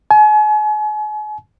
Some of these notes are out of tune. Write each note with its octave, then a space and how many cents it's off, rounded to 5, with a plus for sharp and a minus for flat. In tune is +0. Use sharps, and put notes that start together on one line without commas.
G#5 +40